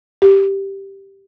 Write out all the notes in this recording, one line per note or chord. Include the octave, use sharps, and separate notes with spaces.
G4